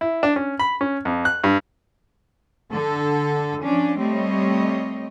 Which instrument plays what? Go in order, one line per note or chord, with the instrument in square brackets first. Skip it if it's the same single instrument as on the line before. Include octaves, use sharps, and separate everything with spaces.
[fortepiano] E4
D4
C#4
B5
C#4
F2
F#6
G2
[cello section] D3 A4
F3 C#4 D4
G3 A3 C4 C#5 D#5